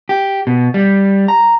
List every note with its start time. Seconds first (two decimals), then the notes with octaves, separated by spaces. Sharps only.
0.09 G4
0.47 B2
0.74 G3
1.28 A#5